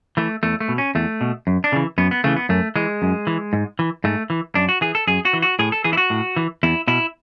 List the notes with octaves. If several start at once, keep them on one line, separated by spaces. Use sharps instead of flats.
E3 A3
E2 A3
A3
B2
C#4
E2 A3
B2
F#2
D4
C#3 E3
F#2 B3
B3
C#3 E3 A3
B3
F#2 A3
E3 G#3
F#2
E3
G#2
E3
G#2 A3
E3
F#2 D4
F#4
E3 G#4
A4
F#2 G#4
F#4
E3
F#4
A2 G#4
A4
E3 G#4
E4
F#4
A2
E3
E2 E4
B2 E4